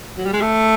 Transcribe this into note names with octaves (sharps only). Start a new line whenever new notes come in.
F#3
G3
G#3
A3